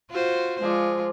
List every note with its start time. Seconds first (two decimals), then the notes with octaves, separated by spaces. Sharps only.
0.10 F4 F#4 C5
0.62 F3 G#3 F4 G#4 D5